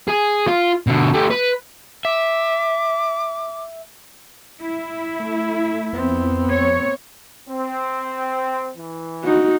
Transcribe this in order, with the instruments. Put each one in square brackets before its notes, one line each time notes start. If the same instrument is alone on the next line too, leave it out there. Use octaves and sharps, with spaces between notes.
[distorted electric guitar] G#4
F4
B2 D3
A3 G4
B4
[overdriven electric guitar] E5 [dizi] D6
[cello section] E4
[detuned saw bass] A3
[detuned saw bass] F2 [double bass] B3 C4
[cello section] C#5
[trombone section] C4
E3
[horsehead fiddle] D#4 F#4